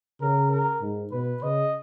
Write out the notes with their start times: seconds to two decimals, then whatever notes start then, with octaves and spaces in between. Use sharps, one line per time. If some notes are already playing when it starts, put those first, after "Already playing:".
0.21 C#3 A#4
0.51 A#4
0.81 G#2
1.11 B2 B4
1.42 C#3 D#5